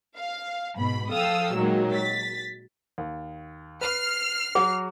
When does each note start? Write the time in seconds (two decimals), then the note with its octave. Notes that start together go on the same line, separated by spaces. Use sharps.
0.18 F5
0.76 G#2 B2 B5
1.12 F3 A4 F5 G5 D#6 E6
1.55 A#2 D#3 F#3 G#3 A#3
1.92 A6 B6
2.98 D#2
3.81 B4 F6 C7
4.55 F#3 F#4 G#4